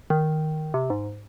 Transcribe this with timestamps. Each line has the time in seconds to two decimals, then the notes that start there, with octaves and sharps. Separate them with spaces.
0.10 D#3
0.74 C3
0.90 G#2